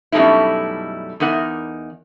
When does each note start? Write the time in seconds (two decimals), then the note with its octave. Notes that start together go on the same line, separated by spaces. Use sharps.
0.12 F#2 B2 G3 A3 D#4 E4
1.20 E2 D#4 A#4 F#5